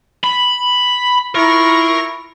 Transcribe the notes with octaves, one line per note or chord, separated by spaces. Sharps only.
B5
E4 F4 A#4 C#6